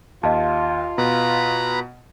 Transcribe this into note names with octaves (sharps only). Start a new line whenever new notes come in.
D#2 F4 D#5 F5 A5
B2 B4 A#5 B5